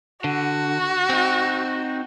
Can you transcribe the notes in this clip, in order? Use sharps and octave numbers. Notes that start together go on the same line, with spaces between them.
D3 F#4
C4 D#4